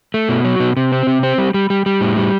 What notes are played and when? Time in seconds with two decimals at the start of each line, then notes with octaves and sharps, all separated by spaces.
0.14 A3
0.29 B2
0.45 F#3
0.60 B2
0.77 C3
0.92 C4
1.07 C3
1.23 C4
1.38 G3
1.54 G3
1.70 G3
1.86 G3
2.01 A2
2.17 G3